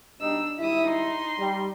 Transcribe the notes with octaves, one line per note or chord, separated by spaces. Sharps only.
B2 G3 D4 D#4 E6
G#1 G3 E4 E5 D#6
D#4 C6
G3